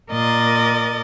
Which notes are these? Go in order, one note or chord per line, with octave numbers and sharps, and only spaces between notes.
A#2 A#4 D5 D#5 A6